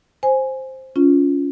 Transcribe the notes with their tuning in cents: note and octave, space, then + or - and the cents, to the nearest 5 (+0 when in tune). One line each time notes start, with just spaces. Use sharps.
C5 +5 G#5 +0
C#4 +20 F4 +0